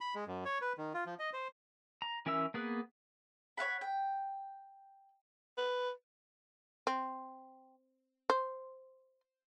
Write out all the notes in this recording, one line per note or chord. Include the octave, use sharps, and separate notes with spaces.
B5
G#3
F#2
C#5
B4
D#3
F4
F3
D#5
C5
A#5
E3 C#4 A#4 E5 E6
A#3 B3 G#4 B4
C#5 F5 F#5 B5
G5
B4
C4
C5